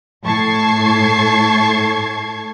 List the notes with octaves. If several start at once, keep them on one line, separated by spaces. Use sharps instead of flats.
A2 A4 A5 C#6 G#6 C7